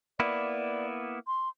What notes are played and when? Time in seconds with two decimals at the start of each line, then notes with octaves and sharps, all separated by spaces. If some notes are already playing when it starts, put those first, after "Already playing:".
0.20 A#3 B3 E4 D5
1.27 C6